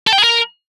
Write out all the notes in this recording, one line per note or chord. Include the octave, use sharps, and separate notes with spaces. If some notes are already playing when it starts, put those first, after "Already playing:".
A4
G5
G#4
A#4